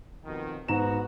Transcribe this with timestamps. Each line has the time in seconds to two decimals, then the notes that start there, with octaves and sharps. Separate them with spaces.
0.25 F2 B2 D#3
0.68 G#2 B3 F#4 A#5 E7